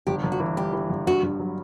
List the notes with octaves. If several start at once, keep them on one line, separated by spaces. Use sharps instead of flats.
G1 G4
G1
F#4
E3
G3 G4
E3
G1
G2 F#4
G2
F#3